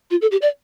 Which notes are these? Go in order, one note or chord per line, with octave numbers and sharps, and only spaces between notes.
F4
A4
G4
D5